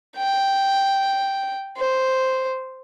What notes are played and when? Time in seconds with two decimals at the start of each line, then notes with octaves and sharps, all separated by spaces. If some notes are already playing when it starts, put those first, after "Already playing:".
0.17 G5
1.77 C5